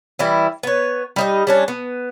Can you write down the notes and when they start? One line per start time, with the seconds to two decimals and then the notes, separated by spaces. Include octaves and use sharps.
0.19 E3 G3 E4
0.63 B3 C#5
1.16 G3 D#4 D#5
1.47 G3 C#4 D4
1.68 B3